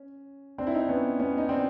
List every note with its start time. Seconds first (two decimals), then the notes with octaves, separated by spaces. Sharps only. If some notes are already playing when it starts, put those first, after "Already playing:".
Already playing: C#4
0.58 C4 D4
0.67 E4
0.75 D#4
0.82 D4
0.89 B3 C#4
1.20 B3 C#4
1.38 D#4
1.49 C4 D4